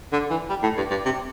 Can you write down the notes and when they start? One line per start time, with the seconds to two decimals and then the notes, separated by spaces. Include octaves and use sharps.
0.13 D3
0.30 E3
0.49 G3
0.63 A2
0.77 G2
0.90 G2
1.05 C3